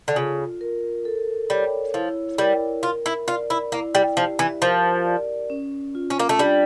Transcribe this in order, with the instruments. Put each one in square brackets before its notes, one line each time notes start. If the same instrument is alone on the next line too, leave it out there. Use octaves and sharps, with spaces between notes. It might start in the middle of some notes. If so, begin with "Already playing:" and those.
[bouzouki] D3
[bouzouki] C#3 [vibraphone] F4
[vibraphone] A#4
A4
[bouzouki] G3 [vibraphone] C#5
[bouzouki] F3 [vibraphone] E4
[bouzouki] G3 [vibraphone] A#4
[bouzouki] F4 [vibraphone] A#4
[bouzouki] E4
[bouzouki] F4 [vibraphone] D5
[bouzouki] E4
[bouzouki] A#3 [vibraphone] E4
[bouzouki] G3
[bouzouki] F3 [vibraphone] G4
[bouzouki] E3
[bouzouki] F3 [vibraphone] A#4
[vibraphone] D5
C#4
F4
[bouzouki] C#4
A#3
A3
[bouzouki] G3 [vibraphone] D4